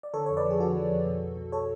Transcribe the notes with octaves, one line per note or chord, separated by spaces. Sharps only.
D5
D3 A4 C#5
F2 C#5
B4 D5
F3
G#4
D3 F#4 A4
F3
F2
B2
B1
B2
A4 C#5